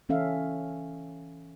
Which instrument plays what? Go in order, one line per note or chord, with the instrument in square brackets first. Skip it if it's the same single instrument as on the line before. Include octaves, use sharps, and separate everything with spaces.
[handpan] E3 C#4 A4 E5 F5